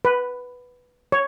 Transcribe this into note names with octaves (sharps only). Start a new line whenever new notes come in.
B4
C#5